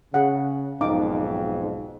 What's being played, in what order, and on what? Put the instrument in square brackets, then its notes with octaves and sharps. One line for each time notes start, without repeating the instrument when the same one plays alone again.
[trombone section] C#3 [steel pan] G#4 F#5
[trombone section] B1 F2 G#2 [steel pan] D#4 F5 D6